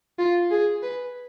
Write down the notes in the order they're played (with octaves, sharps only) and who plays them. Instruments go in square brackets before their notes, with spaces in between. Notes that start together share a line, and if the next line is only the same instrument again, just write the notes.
[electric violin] F4
G#4
B4